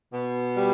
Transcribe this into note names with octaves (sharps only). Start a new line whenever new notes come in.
B2
G3